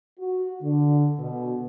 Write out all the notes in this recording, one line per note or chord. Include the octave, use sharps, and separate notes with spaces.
F#4
D3
B2